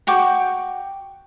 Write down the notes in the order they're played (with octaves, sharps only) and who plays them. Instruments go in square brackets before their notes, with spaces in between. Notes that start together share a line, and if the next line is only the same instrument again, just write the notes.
[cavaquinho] F#4 G5 C#6 D6